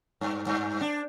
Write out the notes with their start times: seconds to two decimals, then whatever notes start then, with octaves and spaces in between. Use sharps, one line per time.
0.21 G2
0.47 G2
0.81 D4